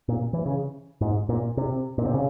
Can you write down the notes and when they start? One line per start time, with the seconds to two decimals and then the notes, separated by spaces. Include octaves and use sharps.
0.08 A#2
0.33 E3
0.46 C#3
1.01 G#2
1.29 A#2
1.57 C3
1.98 A#2
2.05 C3
2.14 C#3